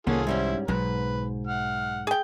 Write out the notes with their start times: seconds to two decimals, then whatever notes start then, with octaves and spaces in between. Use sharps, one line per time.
0.07 C2 D#3 A#3 B3 C#4 F4 G#4 A4
0.27 G#2 G3 C#4 E4 C5
0.68 B1 G#2 B2 F#3 B4
1.47 F#5 F6
2.07 G#4 G5